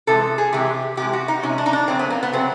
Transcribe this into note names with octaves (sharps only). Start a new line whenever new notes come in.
C3 E3 G#3 A4
G#4
C3 E3 G#3 G4
C3 E3 G#3 G4
F#4
D#4
C3 E3 G#3 C#4
D4
D#4
D4
F2 C#3 F#3 A3 C4
B3
A#3
B3
C#3 F#3 A3 C4